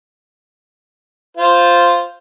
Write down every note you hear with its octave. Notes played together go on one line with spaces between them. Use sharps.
F4 C5